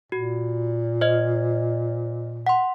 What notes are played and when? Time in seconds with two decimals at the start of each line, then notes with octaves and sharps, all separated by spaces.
0.12 A#2 F#4
1.01 C5 D#5
2.47 F#5 C6